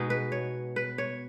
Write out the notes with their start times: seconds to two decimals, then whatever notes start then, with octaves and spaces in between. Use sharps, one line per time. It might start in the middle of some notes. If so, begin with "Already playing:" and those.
Already playing: B2 G#3 B3 D#4 F#4
0.10 B4
0.32 C#5
0.76 B4
0.98 C#5